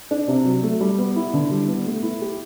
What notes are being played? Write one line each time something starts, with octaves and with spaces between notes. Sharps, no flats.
D4
C3
F#3
A3
G3
B3
E4
D3
G3
B3
A3
E4
G4